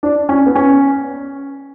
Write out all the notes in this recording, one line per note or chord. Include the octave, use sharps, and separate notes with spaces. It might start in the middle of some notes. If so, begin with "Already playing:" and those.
D4
C#4
B3
C#4